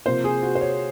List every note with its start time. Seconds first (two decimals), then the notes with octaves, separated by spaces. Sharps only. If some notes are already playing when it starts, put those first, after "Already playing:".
0.06 C3 F3 A#3 C5
0.24 G#4
0.43 F#4
0.55 C5
0.61 C#5